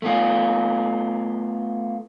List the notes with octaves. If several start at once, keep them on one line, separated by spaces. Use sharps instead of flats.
A3 B3 F4